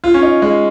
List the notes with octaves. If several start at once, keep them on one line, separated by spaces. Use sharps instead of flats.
F4
C#4
D#4
G#3